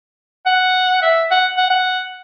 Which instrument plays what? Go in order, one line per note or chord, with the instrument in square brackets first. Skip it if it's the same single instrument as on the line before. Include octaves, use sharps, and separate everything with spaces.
[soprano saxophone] F#5
E5
F#5
F#5
F#5